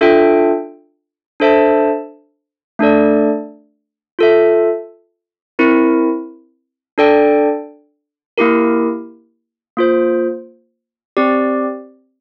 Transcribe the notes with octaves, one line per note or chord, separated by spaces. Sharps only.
D4 F4 A4 E5 G5
D4 A4 C5 E5 A5
A3 D4 A4 D5
F4 A4 E5
C4 E4 A#4
D4 A4 D5 G5
A#3 E4 G4 A#4
A#3 F4 C5
C4 G4 D5